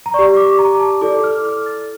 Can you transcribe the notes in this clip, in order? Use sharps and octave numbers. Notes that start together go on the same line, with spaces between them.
A#5
G4 D5 C#6
D6
A#5
A5
E4 A4 D5 D6
F6
F6
A6